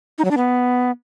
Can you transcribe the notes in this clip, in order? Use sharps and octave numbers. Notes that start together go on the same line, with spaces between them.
D#4
F#3
D4
B3